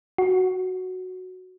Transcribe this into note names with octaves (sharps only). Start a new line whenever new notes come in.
F#4